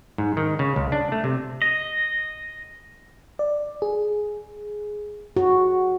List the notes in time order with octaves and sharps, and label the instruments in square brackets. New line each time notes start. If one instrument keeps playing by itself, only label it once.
[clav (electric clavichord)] G#2
D#3
C#3
C#2
D4
A3
C3
[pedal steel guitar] D#5
[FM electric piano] D5
G#4
[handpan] F#4